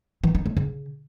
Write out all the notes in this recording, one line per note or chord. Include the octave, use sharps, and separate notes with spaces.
E3
D#4
A3
C#3